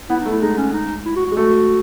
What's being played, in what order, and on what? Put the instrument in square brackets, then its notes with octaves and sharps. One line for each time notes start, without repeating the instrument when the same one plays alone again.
[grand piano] B3 [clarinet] E4
[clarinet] D#4
[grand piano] A3
[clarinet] E4
[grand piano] G#3 [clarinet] D#4
[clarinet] C#4
D#4
E4
F#4
F#4
[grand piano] G#3
[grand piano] A3 [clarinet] F#4